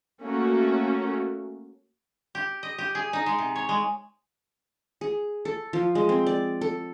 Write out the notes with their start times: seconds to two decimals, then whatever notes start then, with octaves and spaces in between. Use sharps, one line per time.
0.22 A3 A#3 C#4 F#4
2.35 G4
2.63 D#5
2.78 G4
2.95 G#4
3.13 D#4
3.26 G#3
3.38 C3
3.56 C#5
3.69 G#3
5.01 G#4
5.45 A4
5.73 F3
5.95 G#3
6.09 C4
6.26 D5
6.61 A4